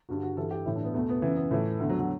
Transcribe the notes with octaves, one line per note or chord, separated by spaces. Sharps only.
G2 D3 F#4
F#4
G2 E3 A4
G4
A2 E3 E4
D4
B3
E2 B2 A3
B3
F#2 C#3 E3 B3
B3
A2 E3 A3
E2 D3 A3
F#3
F#3